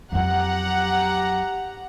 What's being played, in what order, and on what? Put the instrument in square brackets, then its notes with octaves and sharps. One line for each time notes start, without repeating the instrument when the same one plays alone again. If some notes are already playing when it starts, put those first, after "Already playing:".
[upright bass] F2 F#3 [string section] G4 F#5 A#5